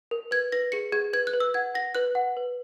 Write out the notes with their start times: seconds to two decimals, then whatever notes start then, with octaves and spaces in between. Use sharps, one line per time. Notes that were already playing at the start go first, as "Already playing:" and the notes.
0.11 A#4
0.31 B4 G#6
0.52 B4 A#6
0.72 G#4 C#7
0.92 G#4 G#6
1.13 B4 G#6
1.27 F#6
1.33 B4
1.40 E6
1.54 F#5 G#6
1.74 F#5 A#6
1.95 B4 F#6
2.15 F#5
2.37 B4